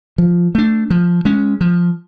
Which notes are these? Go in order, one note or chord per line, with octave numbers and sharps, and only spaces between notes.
F3
A3 D4
F3
G#3 C#4
F3